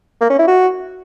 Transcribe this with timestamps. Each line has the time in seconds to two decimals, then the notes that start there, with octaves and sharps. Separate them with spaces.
0.21 A#3
0.30 C#4
0.39 E4
0.48 F#4